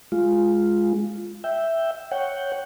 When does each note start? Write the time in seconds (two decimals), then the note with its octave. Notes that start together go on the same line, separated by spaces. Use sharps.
0.12 G#3 F4
1.44 E5 G5
2.11 C#5 F#5 G5